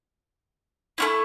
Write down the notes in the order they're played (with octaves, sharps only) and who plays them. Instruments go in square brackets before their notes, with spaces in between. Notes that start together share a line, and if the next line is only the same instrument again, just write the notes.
[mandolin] A3 C#4 E4